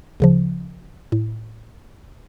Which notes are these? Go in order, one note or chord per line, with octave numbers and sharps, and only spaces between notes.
D2 C#3 F3
A2